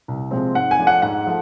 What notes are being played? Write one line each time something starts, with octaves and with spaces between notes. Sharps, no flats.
C2
C3 F3 G#3 C4
G#2 F#5
G#5
F3 A3 D4
F#5
G#2 F#5
F3 A3